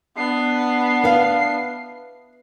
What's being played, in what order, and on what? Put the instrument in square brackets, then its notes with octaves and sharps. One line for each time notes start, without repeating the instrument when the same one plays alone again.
[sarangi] B3 [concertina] D4 [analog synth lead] C7
[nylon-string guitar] B4 E5 F5